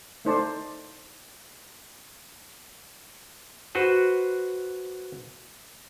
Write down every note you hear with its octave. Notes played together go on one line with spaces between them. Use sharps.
A3 D#4 C5 D5 A5
F#4 B4 C5